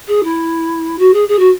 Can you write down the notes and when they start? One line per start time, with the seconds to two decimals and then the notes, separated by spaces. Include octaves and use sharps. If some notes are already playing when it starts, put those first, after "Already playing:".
0.07 G#4
0.23 E4
0.98 F#4
1.13 G#4
1.28 G#4
1.38 F#4